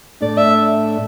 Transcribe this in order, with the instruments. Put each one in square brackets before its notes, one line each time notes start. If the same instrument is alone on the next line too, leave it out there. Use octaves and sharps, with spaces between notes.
[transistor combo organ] A2 A3 D4 [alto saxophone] D5
[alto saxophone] E5